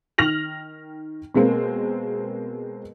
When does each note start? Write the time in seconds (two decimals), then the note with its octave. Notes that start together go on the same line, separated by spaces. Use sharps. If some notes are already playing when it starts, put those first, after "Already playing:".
0.18 D#3 F6 A#6 F7 F#7
1.34 B2 G#3 A#3 C4